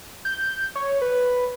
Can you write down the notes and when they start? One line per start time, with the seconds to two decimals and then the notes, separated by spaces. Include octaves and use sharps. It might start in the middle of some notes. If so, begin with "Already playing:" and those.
0.25 G6
0.75 C#5
1.02 B4